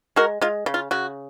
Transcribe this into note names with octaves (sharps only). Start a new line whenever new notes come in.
G#3 F#4 A#4
G#3 F4
C#3
F4
C#3 F#4